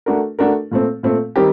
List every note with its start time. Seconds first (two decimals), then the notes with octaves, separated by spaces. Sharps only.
0.06 A3 D4 F#4 A#4
0.39 A3 D4 F#4 A#4
0.71 A#2 A3 C4
1.03 A#2 A3 C4
1.36 D#3 G3 C4 G4 A#4